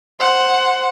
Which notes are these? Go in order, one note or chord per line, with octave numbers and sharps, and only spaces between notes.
C5 F#5